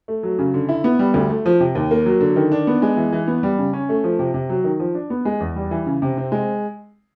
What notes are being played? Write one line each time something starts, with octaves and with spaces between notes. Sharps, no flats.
A3
F#3
C#3
D3
E4
B3
G3
D2
A3
F3
C3
D#2
A#3
F#3
D3
D#3
D4
B3
G#3
E3
E3
B3
G3
C#3
C#4
A3
F3
C3
C3
F#3
D#3
F3
D4
B3
G#3
E2
G3
E3
C#3
C3
C4
G#3